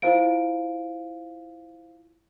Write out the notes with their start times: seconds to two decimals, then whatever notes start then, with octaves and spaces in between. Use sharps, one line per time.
0.02 E4 F4 C5 F5 D7